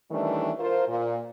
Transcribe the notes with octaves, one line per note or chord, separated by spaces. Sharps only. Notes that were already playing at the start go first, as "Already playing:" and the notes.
D#3 E3 G3 A3 C#4 D4
F4 A#4 C5
A#2